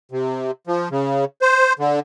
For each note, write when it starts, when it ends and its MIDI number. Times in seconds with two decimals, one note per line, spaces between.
0.12 0.51 48
0.67 0.89 53
0.91 1.25 49
1.42 1.73 72
1.79 2.00 50